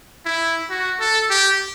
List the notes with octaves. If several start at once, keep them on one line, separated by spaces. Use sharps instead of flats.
E4
F#4
A4
G4